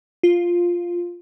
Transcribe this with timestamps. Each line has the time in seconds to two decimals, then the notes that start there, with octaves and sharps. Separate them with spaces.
0.23 F4